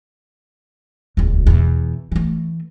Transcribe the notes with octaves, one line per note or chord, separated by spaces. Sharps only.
D#1 C#2
E2 B2
E3 A3